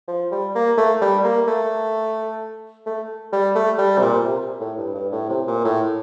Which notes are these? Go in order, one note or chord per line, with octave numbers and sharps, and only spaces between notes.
F3
G3
A#3
A3
G3
A#3
A3
A3
G3
A3
G3
C3
A#2
C3
A2
G2
G2
A2
C3
A#2
A2